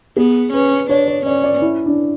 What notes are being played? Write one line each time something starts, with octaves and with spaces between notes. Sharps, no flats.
B3 G#4
C#4 B4
D4 C#5
C#5
C#4 D5
D5
E4
D4